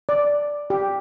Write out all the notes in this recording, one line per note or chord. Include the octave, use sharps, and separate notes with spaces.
D5
G4